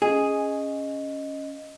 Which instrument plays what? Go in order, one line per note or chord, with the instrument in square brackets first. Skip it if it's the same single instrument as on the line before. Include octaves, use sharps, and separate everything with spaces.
[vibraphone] C#4 D#5 F5 [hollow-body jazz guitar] G#4